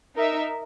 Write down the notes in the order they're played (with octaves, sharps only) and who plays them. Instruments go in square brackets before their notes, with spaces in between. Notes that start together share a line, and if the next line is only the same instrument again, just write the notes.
[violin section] D#4 A#4 E5